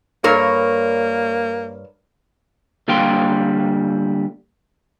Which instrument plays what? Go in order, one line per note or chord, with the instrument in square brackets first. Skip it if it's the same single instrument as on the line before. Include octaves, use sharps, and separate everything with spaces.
[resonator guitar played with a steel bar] G2 A#4 C#5 [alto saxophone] A#3
[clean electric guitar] D3 G3 A#3 F5 G5 C6